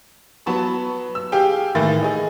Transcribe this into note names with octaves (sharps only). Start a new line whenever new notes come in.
F#3 B3 A5 B5 C#6
E6
G4 G#4 F5 G5
A2 D#3 E3 A#4 A6
G#4 D#5